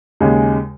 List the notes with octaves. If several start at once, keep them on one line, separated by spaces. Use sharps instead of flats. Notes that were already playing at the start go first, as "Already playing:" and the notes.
D#2 C#3 G#3